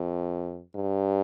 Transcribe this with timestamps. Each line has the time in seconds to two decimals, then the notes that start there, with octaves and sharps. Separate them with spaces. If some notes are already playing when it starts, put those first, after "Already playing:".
Already playing: F2
0.76 G2